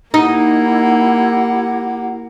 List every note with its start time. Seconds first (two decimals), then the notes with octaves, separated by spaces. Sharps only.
0.14 A#3 D#4 E4 G4 F#5